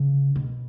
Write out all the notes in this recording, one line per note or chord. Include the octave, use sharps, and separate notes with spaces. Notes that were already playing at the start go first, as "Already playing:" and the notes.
Already playing: C#3
B2